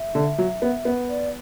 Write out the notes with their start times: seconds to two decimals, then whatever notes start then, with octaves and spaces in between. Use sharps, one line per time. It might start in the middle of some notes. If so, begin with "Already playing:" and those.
Already playing: E5
0.15 D3
0.38 F#3
0.62 B3
0.85 B3
1.09 D5